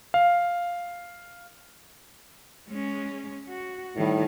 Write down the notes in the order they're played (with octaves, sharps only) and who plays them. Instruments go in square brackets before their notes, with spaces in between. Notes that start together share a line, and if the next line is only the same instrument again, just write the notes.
[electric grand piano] F5
[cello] G#3 C#4
F#4
[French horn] A2 [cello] D#3 G3